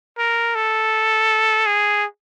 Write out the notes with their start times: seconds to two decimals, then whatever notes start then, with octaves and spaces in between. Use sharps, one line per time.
0.18 A#4
0.55 A4
1.66 G#4